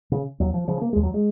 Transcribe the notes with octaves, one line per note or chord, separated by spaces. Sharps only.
C#3
D#2 F#3
F3
C#3 F3
A#3
D#2 G#3
F#3
G#3